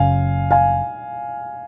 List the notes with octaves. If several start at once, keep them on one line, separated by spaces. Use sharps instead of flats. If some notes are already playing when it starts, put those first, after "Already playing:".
Already playing: F#1 F#2 C#3 F5 G#5
F5 G#5